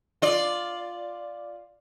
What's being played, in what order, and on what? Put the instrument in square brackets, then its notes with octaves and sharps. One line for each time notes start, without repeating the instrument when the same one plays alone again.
[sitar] F4 D5